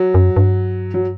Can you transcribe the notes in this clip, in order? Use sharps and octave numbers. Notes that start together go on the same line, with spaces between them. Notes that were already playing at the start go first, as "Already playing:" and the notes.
Already playing: F#3
F#2
G2
F#3